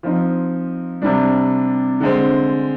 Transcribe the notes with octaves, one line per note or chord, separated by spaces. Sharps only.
F3 C4 D#4
C3 G3 D4
D3 G#3 C4